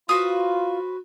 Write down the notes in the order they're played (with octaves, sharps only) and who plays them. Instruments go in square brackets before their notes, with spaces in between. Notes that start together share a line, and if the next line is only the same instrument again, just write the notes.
[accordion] F4 [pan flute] F#4 [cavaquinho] B4 C5 D#6